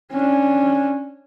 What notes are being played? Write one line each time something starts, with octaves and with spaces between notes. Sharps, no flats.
C#4 D4